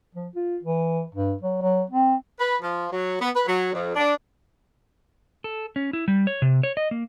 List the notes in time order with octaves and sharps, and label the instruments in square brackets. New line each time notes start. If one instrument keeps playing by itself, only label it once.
[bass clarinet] F3
F4
E3
G2
F#3
F#3
C4
[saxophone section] B4
F3
F#3
B3
B4
F#3
F2
D4
[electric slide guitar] A4
C#4
E4
G3
C#5
C3
C#5
D#5
A#3